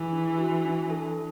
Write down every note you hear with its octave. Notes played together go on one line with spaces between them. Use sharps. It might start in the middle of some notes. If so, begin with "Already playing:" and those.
Already playing: E3 G#4
D4
F#4
D4
A4